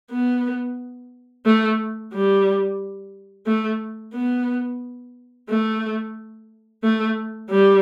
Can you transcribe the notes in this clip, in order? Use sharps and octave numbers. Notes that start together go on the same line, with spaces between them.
B3
A3
G3
A3
B3
A3
A3
G3